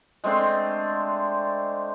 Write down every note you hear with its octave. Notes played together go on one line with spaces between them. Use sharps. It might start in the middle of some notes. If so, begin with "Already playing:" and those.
G#3 A3 C4 D4